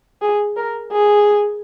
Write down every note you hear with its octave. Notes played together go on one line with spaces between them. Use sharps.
G#4
A#4
G#4